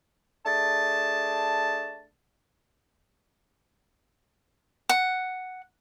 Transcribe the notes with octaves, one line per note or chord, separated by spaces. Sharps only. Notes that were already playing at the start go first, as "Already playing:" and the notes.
A3 D4 G#4 A5
F#5